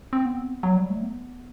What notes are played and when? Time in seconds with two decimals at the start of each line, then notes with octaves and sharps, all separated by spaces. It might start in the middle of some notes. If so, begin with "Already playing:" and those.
0.13 C4
0.26 B3
0.63 F#3
0.77 G3
0.90 A3
1.03 B3